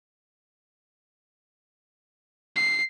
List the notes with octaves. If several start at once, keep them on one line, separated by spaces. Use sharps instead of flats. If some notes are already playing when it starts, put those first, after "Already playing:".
C7